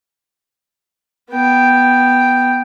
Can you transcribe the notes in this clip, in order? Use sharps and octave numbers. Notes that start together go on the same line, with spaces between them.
B3 G5